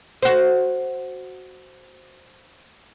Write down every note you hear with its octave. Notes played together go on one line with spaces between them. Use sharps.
F#4 C5